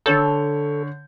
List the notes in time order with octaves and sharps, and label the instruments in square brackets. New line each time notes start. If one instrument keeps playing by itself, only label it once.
[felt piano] D3 C#5 G6 [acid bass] A4